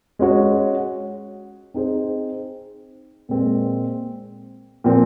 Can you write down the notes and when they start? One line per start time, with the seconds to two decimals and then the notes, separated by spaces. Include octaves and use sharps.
0.19 G#3 C#4 F#4 C#5
1.74 C4 D#4 G#4 C5
3.29 A#2 G#3 C4
4.84 A#2 F3 C4